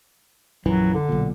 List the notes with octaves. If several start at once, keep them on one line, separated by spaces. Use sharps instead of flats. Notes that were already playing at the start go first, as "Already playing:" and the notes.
A#1 F#2 E3 F#3
D3
B1 A#2